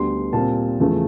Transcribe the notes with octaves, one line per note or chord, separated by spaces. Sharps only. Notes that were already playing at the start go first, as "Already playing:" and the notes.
Already playing: D2 D3 G3 B3 D4 C6
A#2 G3 C4 A5
E2 C#3 F3 A3